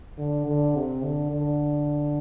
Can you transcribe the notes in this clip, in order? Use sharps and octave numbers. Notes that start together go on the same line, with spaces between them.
D3
D3
C3
D3
D3